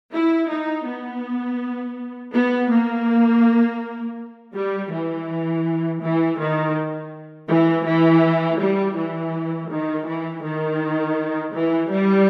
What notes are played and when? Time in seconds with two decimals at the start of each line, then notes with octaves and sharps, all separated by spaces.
0.13 E4
0.49 D#4
0.86 B3
2.33 B3
2.70 A#3
4.54 G3
4.91 E3
6.01 E3
6.39 D#3
7.48 E3
7.86 E3
8.59 G3
8.96 E3
9.70 D#3
10.07 E3
10.43 D#3
11.53 E3
11.90 G3